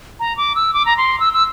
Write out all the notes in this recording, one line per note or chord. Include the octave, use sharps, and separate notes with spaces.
A#5
D6
E6
D6
A#5
C6
E6
E6